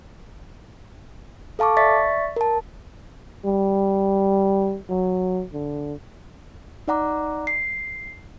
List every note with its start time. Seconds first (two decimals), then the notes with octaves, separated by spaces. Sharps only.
1.59 A4 F5 A5 C#6 D6
1.77 D5 E5 C#6 A6 B6
2.36 A#4 A5
3.46 G3
4.90 F#3
5.54 D3
6.88 D#4 D5 F#5 A#5 D6
7.47 C7